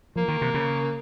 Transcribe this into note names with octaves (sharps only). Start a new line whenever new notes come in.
F3 A#3
D#3
C3
C#3